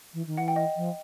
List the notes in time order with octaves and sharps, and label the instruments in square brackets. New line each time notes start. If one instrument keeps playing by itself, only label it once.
[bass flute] E3
D#3
[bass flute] E3 [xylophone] F#5
[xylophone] G5
D#5
[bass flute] F3